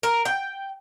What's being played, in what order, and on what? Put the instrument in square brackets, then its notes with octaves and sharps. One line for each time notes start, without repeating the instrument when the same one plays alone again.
[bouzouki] A#4
G5